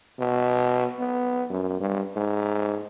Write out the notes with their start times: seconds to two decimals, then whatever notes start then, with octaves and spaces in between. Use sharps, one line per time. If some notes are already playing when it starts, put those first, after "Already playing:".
0.19 B2
0.99 B3
1.50 F#2
1.80 G2
2.16 G#2